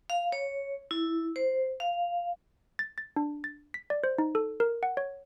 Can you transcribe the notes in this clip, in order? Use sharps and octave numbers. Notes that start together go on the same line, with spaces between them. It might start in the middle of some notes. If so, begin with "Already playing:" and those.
F5
C#5
E4
C5
F5
A6
A6
D4
A6
B6
D5
C5
D#4
A4
A#4
F#5
C#5